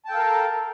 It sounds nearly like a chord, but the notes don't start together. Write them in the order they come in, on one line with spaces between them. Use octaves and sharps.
A5 G5 A4 F5 A#4